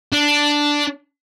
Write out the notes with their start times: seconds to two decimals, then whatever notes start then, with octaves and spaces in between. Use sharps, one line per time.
0.13 D4